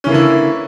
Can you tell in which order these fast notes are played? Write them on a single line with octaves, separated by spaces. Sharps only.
C#4 E3 A#3 D3 E4